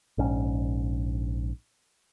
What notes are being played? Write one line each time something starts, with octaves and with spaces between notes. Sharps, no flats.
A#1 G#2 C#4